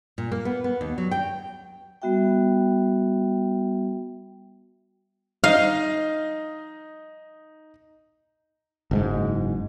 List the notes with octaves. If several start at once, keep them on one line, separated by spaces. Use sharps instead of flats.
A#2
A#3
B3
B3
D#2
F#3
G5
G3 B3 F#4 E5 G5
D#4 D#5 F5
F#1 G#2 G#3